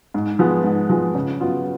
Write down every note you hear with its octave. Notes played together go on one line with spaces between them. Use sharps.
G#2
F3 G#3 B3
G#2
F3 G#3 B3
C#3
F#3 B3 F4